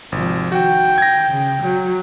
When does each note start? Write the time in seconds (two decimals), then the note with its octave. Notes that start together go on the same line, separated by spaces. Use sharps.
0.12 G#1 C3 F3
0.52 D#3 F#4 G5
0.98 G#6 A#6
1.29 C#3
1.61 F#3